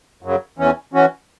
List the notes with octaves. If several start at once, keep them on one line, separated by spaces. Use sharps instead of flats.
F#2 C#3 F#3
E2 E3 C#4
E3 C#4 F#4